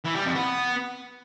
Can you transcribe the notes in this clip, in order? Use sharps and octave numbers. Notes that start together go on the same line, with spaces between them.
E3
G3
F2
B3